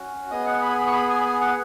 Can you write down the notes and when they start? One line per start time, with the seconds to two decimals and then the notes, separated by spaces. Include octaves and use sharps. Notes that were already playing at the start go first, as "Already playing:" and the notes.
Already playing: C#4 F#4
0.31 B3 G#4 D#5
0.46 F#5
0.62 B5
0.72 G#5
0.78 B5
0.87 C#6
0.93 B5
1.09 G#5
1.20 B5
1.25 G#5
1.41 F#5